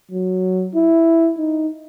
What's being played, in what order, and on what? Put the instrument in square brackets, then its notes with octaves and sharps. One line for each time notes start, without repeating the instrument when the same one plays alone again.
[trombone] F#3
E4
D#4